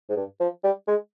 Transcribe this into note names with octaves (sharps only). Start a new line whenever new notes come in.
G#2
G2
F3
G3
G#3